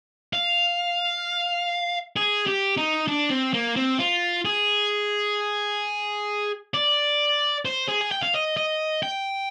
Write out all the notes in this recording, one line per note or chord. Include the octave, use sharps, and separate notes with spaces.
F5
G#4
G4
D#4
D4
C4
A#3
C4
F4
G#4
D5
C5
G#4
G#5
G5
F5
D#5
D#5
G5